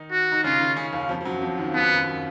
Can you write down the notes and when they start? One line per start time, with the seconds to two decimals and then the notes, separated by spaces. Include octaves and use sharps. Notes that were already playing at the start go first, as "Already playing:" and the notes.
Already playing: D#3 D#4
0.11 F#4
0.32 D#4
0.44 C#3 C#4 F4
0.60 D#3 D#4
0.76 C#3 C#4
0.93 D#2 D#3
1.09 F2 F3
1.21 F3
1.25 F#2 F#3
1.41 F2 F3
1.58 D#2 D#3
1.74 D#2 D#3 B3
1.96 F#2 F#3